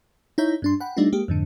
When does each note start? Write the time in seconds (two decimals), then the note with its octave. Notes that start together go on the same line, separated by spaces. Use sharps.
0.38 D#4 E4 C#5 E5 A#5 G6
0.62 G2 D4 C6
0.80 F#5 G5 B5
0.97 G3 A3 D4 D#4 F4
1.12 G#3 A#3 G4
1.28 F2 G#2 D3